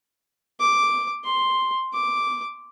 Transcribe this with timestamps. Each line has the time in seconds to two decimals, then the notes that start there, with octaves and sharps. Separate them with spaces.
0.60 D6
1.25 C6
1.93 D6